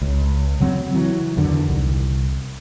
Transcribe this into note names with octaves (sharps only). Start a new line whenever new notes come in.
C#2
C#3 F#3 C4
E3 F#3
E2 D3 D#3
C2